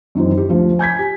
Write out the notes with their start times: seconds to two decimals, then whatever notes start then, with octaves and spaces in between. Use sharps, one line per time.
0.15 F#2 D#3 E3 C4
0.37 G4
0.49 D2 F3
0.79 G#5 G6 G#6 B6
0.99 G4